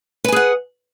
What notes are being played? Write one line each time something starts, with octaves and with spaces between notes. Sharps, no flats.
G#4 B4 F#5 G#5